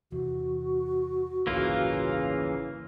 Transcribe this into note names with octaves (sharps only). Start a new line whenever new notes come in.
E2 C3 E3 F#4
A1 D2 G2 C#3 E3 A#3 F4